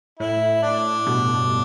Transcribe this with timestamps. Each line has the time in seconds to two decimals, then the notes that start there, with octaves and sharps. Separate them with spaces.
0.19 A2 E4
0.62 D4
1.06 G2 B2